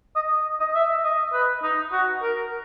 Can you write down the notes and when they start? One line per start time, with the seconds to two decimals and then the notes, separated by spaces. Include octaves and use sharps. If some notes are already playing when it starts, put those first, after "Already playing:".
0.16 D#5
0.60 D#5
0.74 E5
1.04 D#5
1.33 B4
1.63 D#4
1.92 F#4
2.22 A#4